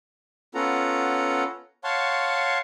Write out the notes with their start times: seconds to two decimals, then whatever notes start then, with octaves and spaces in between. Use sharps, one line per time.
0.55 B3 C#4 F4 A4 F#5 A#5
1.84 C#5 F5 F#5 A5 C6 C#6